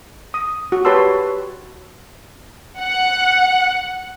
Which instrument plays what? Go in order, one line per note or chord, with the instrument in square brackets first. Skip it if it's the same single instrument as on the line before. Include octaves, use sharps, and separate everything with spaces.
[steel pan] D#6
F#4
G4 B4 C#5 A5 C6 E6
[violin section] F#5